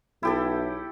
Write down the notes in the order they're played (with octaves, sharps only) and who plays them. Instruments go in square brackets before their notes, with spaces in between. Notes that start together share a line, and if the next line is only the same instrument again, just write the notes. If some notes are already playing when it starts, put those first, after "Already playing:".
[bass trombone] B1 [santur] E4 G4 A4